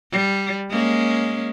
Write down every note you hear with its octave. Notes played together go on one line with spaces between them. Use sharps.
G3
G#3 A#3 C#4